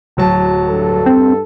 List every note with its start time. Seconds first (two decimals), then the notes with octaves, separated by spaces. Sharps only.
0.17 D1 F#3 A5
0.68 G2 A4
1.06 C4